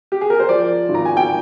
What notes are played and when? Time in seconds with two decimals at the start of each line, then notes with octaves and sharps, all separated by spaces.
0.12 G4
0.21 G#4
0.30 A#4
0.40 C5
0.49 F3 D5
0.89 G#1
0.95 A#5
1.05 G#5
1.17 G5